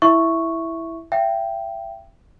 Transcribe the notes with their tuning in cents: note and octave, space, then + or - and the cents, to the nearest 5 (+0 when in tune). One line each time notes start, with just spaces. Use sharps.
E4 +0 E5 +0 C#6 +0
E5 +35 G5 -5